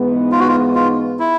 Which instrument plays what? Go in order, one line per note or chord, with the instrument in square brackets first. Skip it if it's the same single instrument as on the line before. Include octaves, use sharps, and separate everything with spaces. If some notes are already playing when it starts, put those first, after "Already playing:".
Already playing: [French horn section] G#2 E3 G#3 B3 D#4
[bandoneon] F4
F#4
F4
F4
E4